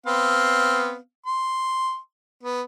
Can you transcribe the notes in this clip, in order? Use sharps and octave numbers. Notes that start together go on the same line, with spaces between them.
B3 C4 F5
C6
B3